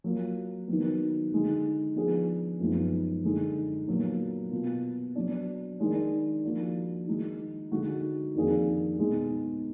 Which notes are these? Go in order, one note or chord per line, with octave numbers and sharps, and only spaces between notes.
F#3 A#3 F4
D#3 F#3 B3
D3 G#3 D#4
F3 B3 D4 G#4
F#2 F3 G#3 B3 D#4
D3 G#3 D#4
A#2 F#3 B3
B2 A#3 F4
F#3 B3 D4
D#3 G#3 D4
F3 A#3 D4 F#4
D#3 G#3 D#4
D3 G#3 D#4 F#4
F2 D#3 A#3 D4 G#4
B2 G#3 D#4 G#4